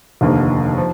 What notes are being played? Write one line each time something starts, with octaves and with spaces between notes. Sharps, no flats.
F1 D#2 D3 F3 A#3
F3